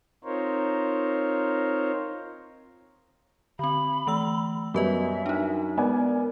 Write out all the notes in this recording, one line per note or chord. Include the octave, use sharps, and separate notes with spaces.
C4 D#4 F4 A#4 C5 C#5
D3 C4 B5
E3 A3 E6
F#2 G3 B3 B4 D#5 E5
D4 D#4
G#3 B3 A#4 D5 G#5